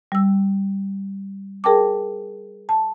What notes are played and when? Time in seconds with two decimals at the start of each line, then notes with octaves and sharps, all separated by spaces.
0.12 G3 E6
1.64 G#4 A#4 G5 A5 D6
2.69 A5